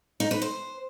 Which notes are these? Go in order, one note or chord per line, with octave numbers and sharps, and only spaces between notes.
D#4
B4
C5